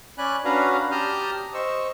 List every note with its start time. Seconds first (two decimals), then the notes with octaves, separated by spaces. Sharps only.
0.18 C#4 D5 G#5 B5 F#6
0.45 C#4 D4 F#4 B4 F5 A#5
0.91 G4 A5 A#5 D#6 F6 G6
1.54 C5 D#5 C#6 E6